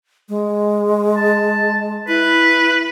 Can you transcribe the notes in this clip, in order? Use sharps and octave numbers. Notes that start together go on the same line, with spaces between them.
G#3
A5
E4 B4